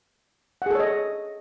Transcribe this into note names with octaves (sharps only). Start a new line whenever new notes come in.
G#4 A4 C#5 D#5 F#5